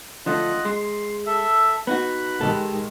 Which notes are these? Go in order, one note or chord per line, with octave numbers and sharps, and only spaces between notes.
D3 F3 A3 F4 D#5 F#5
G#3 C6
A4 E5
B3 D#4 F#4 F#5 B5
D#3 G#3 G4 A4